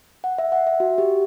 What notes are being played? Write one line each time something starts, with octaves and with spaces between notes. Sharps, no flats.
F#5
E5
F#5
E5
F#4
G4